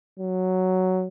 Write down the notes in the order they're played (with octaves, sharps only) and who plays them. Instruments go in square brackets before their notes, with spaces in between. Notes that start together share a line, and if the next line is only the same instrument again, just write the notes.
[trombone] F#3